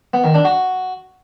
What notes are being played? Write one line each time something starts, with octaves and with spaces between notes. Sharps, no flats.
B3
D#3
D4
F#4